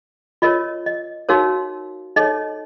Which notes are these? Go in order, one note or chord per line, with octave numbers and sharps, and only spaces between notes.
F4 A#4 C#5 D#5
D#5
D#4 F#4 A#4 C#5 F5
D#4 A4 C#5 D#5